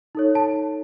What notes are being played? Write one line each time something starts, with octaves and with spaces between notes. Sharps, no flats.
D#4 A4 C#5
A5